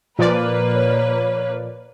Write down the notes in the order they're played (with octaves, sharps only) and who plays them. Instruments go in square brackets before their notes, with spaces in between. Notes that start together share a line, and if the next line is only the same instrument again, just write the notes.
[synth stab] A#2 F3 D5 [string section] A#3 B4
[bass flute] C#5